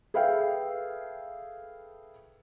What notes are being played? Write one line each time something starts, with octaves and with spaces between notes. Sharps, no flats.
G#4 A4 B4 E5 F5 G5